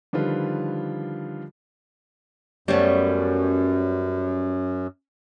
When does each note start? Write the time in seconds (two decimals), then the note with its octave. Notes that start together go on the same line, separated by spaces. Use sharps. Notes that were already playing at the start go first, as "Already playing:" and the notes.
0.13 D3 D#3 F3 G3 F4 B4
2.68 F#2 G3 A3 B3 C#4 C5 D#5